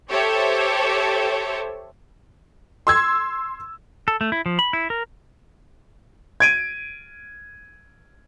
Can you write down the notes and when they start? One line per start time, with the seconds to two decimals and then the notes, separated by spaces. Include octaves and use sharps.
0.10 G4 A4 C5 C#5 E5
2.87 C6 E6 G#6
4.08 A4
4.21 A3
4.32 E4
4.46 F3
4.59 B5
4.73 E4
4.90 A#4
6.40 G#6 D7 D#7